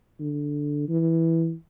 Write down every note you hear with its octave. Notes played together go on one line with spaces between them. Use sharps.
D3
E3